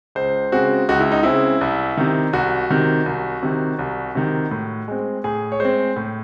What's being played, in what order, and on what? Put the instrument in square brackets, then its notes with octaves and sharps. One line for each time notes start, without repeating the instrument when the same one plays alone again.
[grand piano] C#2 C5
C#3 G#3 C4 F#4
C#2 F#4
E4
D#4
C#3 G#3 C4 E4
C2
C3 D#3
C2 F#4
C3 D#3
C2
C3 D#3
C2
C3 D#3
A2
G#3 C4
A2 G#4
C#5
G#3 C4 C5
A2